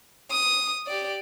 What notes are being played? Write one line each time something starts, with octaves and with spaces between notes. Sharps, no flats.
D#6
G4 D5